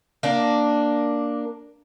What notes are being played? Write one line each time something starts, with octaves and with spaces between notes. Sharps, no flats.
A#3 D4